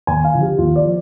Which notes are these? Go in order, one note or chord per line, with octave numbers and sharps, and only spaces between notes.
D#2 G#5
F5
D3 F3
G4
D#2 F4
D5
F3